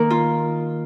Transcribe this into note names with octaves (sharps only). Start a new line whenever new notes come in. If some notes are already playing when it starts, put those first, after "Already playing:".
Already playing: D#3 A#3 A#4
F4